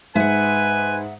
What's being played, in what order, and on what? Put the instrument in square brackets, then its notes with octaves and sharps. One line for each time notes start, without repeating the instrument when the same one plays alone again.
[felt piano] G#2 [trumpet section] B4 G#5 [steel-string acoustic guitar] E5 F#5